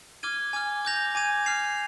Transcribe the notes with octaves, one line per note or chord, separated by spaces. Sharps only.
D6 F6 G#6 D#7 G7
G#5 D6 F6
D6 G6 A#6 F7
G#5 D6 G#6 D#7
F6 C7 F7